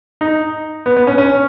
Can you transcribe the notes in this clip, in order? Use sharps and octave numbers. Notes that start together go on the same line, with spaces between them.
D#4
B3
B3
C#4
C#4